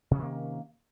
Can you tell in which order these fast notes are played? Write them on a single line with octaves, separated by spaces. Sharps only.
C3 C#4 D#3 A#3